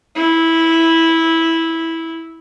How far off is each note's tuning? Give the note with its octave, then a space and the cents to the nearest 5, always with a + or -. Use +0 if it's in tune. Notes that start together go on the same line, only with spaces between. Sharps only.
E4 -10